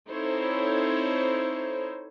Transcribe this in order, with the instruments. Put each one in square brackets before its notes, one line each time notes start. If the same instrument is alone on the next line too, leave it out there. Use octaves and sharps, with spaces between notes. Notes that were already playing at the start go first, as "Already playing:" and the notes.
[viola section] C4 D#4 E4 A4 C5 C#5